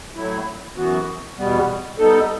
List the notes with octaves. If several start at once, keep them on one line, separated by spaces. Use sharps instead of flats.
A2 F#3 A3 E4
F#2 E3 B3 F#4
E2 B2 G3 B3
G3 B3 D#4 A4